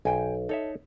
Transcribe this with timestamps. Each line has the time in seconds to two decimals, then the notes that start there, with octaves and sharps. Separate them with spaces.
0.05 B1 C5 G5 G#5
0.49 D#4 A4 C#5 E5